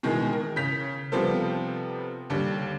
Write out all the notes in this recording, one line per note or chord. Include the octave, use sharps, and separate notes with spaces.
B2 D#3 E3 G#3
A#4
C#3 G6 B6 F7
C3 F3 G3 B3 A4 C5
D#2 D3 G3